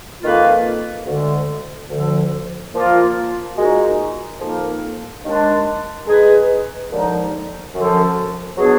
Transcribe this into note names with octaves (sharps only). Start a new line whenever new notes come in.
F2 D#3 A#3 F4 B4
D2 D3 G#3
D2 D3 F3
A#2 F3 A#3 F4 A#4
A#2 G#3 D#4 F#4
F2 F3 A#3 D#4 A#4
D#2 D#3 G#3 D4
G#3 D#4 G#4 B4
D#2 D3 F3 G#3 D#4
F#2 D3 F3
B2 F#3 B3 D4 G#4